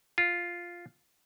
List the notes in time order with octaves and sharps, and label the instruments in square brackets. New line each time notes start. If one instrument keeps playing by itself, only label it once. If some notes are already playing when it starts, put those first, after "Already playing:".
[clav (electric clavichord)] F4